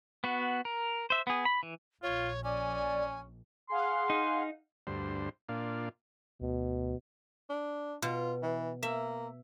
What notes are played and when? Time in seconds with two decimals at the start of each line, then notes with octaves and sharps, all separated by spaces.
0.24 B3 F#4
0.65 A#4
1.10 C5 E5
1.27 B3 G#4
1.45 B5
1.63 E3
2.03 A#1 F4 C#5
2.44 C#4 D5 G#5
3.70 G#4 F5 F#5 C6
4.10 D#4
4.87 D2 G2 C5
5.49 A#2 D4 F4
6.41 D2 B2
7.49 D4
8.02 B2 F4
8.42 E3
8.83 A#3 E5